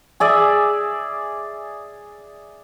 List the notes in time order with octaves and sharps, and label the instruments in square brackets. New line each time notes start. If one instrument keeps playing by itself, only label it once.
[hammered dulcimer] G#4 D5 E5